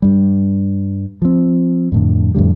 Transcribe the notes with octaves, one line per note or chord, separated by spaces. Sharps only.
G2 G3
F3 C4
F2 A2 D3
F2 A2 D3 G3